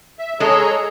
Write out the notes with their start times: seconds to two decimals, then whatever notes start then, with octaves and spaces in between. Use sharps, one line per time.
0.19 E5
0.40 G#3 G#4 A4 C#5 A#5